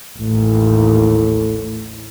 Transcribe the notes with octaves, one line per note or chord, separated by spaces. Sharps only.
A1 D#2 A2